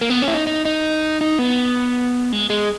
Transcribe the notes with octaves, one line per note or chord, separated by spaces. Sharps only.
A#3
B3
C#4
E4
D#4
D#4
D#4
D#4
B3
G#3
G#3